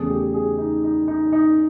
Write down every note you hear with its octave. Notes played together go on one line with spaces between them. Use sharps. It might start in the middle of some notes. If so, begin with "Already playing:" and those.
Already playing: E2 C#3 E3 A3 G#4
G4
G#4
D#4
D#4
D#4
D#4